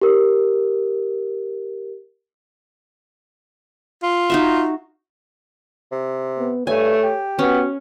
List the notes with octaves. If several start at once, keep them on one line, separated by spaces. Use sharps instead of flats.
G4 A#4
F4
D#4 F#4 E5
C3
B3
G2 A3 C#5 G#5
G4
B3 C#4 F#4